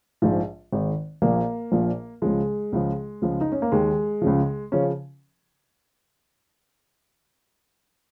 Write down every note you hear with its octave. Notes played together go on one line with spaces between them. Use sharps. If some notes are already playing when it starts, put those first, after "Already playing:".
A#1 G#2 F3
G#1 G#2 D#3
A#1 A#2 F3 A#3
A#1 A#2 F3
C#2 C#3 F3 G#3
C#2 C#3 F3
C#2 C#3 F3
D#4
C#4
A#3
D#2 D#3 G#3
C#2 C#3 F3
C#3 F3 C#4